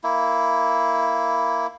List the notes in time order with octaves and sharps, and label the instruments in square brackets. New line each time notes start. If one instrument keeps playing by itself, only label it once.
[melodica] A#3 E4